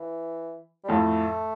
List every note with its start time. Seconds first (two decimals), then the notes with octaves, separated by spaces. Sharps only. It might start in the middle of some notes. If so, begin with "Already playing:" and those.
Already playing: E3
0.84 G3
0.89 F2 A2 A3